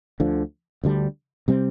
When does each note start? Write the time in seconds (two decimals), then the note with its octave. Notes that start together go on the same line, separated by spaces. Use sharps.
0.20 D2 D3 F3
0.84 D2 D3 G3 D4
1.48 C3 G3 C4